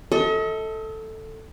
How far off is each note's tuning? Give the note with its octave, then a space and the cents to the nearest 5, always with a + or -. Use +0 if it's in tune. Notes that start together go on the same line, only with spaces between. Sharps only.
A4 +5 D#5 +40